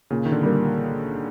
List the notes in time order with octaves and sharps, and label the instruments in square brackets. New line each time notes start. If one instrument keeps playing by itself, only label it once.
[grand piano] A#2 [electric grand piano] C#3
[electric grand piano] D#3
D3
[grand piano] G3 A#3